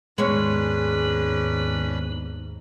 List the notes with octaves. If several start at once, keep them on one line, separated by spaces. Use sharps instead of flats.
D#2 G#2 G#3 B3 C#4 D4 B4 C#5